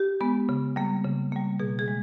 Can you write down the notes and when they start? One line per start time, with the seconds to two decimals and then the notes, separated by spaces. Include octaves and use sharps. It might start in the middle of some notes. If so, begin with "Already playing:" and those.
Already playing: G4
0.21 G#3 B3
0.49 C#3
0.76 G3 A#3
1.04 C#3
1.32 G3 A#3
1.60 B2 G#4
1.79 G#4
1.88 G#3